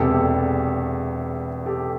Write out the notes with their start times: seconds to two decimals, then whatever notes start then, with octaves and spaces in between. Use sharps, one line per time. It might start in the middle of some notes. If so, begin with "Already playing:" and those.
Already playing: E1 E2 C3 G4 A4
1.66 G4 A4